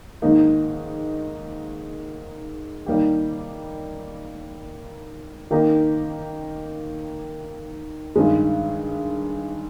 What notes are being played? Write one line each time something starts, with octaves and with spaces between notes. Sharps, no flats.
G#2 D#3 A#3 D#4
D#3 G3 A#3 D#4 G4
D#3 A#3 D#4 G4 A#4
G2 D#3 G#3